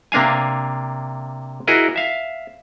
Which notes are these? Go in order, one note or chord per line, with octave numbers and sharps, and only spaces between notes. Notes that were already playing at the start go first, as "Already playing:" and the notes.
C3 A#3 D4 F5 G#5
E4 F#4 G#4 A#4 D#5
E5 F5